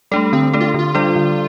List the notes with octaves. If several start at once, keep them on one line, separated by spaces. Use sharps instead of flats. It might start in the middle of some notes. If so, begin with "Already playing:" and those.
G3 A3 D4 A4
D3 C4
A3 D4 A4
F4
D3 F4
G3 D4 A4 D5
D3